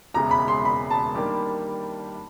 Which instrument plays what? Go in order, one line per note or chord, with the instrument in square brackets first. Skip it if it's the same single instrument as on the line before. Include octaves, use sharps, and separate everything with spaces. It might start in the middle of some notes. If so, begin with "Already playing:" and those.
[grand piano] E1 E2 C#3 E3 G#3 [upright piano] A#5
[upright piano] B5
C6
B5
A5
[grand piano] D#3 G3 A#3 D4 G4